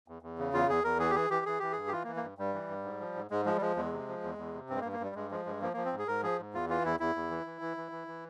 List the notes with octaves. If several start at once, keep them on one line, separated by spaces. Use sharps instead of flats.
E2
E2
C#3
E2 F4
E2 G#4
E2 A#4
E3 G#4
G4
E3 G#4
E3 G4
E3 G#4
E3 G4
G2 G#4
G4
E3 F4
A#3
E3
A#3
G2
G2 G3
E3
G2
G#2
F3
G#2
G#2 G#3
F3 G#3
G3
F3 G#3
E2 G#3
C3
F3
E2
E2
C3
G2 C4
G#3
A#3
G2
A#3
G2 G3
G2 G#3
F3 G#3
G2 G#3
F3 A#3
F3 A#3
C4
G#2
G#4
G#2 A#4
F3 G#4
G#2
E2 F4
E3 F4
E2 E4
E2 E4
E2
E3
E3
E3
E3
E3
E3